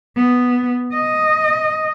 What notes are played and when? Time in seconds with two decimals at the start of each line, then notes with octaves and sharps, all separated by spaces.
0.17 B3
0.93 D#5